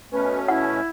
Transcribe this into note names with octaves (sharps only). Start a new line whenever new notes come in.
B2 A3 C#4 B4
E4 F#5